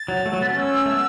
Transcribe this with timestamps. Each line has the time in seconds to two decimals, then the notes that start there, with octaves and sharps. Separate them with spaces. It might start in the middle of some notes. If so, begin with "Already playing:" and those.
Already playing: A6
0.08 F#3
0.26 A3
0.33 F#3
0.42 B3
0.50 C#4
0.59 E6
0.86 A3
0.92 B3